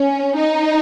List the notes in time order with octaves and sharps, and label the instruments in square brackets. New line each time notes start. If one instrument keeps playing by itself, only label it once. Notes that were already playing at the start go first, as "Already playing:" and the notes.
Already playing: [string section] C#4
D#4